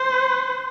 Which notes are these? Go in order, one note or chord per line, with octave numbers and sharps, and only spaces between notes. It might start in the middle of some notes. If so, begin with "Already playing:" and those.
Already playing: C5